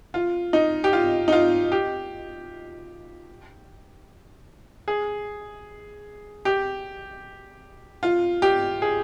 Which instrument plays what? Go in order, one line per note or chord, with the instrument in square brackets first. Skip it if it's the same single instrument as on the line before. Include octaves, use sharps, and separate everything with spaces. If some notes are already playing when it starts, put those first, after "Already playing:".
[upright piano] F4
D#4
G4
F4
D#4
F4
G4
G#4
G4
F4
G4
G#4